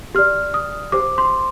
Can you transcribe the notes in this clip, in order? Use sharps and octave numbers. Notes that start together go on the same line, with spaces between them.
G4 D5 F6
D#6
G4 C5 D6
C6